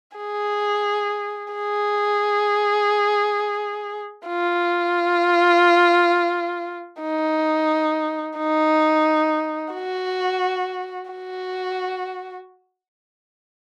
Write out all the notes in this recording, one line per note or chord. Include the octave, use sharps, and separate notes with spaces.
G#4
G#4
F4
D#4
D#4
F#4
F#4